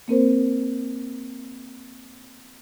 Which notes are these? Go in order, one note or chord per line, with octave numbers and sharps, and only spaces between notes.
A#3 C4 A#4 C5